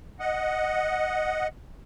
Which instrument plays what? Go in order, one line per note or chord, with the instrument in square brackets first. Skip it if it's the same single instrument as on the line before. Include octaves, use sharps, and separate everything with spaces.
[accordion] D#5 F#5